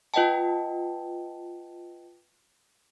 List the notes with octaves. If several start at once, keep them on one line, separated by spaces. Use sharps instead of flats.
F4 B4 D#5 F#5 G5 A5